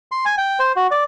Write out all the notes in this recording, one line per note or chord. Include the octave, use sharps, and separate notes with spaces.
C6
G#5
G5
C5
F#4
D5